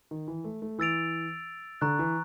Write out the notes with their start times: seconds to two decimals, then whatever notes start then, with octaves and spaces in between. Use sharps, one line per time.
0.11 D#3
0.28 E3
0.44 A3
0.62 A3
0.79 E3 E6 A6 D7 F7
1.81 D3 A#5 C#6 F#6
1.99 E3